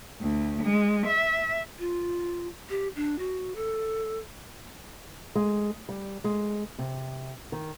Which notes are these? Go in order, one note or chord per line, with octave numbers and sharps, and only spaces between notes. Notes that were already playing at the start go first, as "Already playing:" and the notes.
D2
G#3
E5
F4
G4
D4
F#4
A4
G#3
G3
G#3
C3
D#3